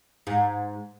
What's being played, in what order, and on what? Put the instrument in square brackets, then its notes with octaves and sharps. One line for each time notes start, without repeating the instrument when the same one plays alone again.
[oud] G#2